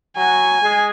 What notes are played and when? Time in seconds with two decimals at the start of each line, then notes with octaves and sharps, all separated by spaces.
0.17 F#3 F#4 G#5
0.61 G#3 G#4